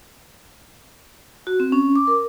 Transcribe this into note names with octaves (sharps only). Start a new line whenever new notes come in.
F#4
C4
C#4
D6
A#4